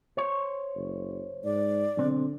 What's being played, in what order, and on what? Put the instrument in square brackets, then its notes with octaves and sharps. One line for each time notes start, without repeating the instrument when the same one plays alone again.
[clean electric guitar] C5 C#5
[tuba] F#1
[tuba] G#2 [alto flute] D5
[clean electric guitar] B1 C4 [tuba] D3